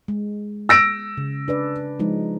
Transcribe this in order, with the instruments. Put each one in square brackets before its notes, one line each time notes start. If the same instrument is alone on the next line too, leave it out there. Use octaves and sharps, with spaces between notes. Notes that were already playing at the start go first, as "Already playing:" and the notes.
[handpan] G#3
[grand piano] E6 A#6 D7
[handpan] C#3
D4 B4 D5
F3 G#3 D#4